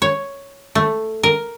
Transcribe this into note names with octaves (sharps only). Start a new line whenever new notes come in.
C#5
A3
A#4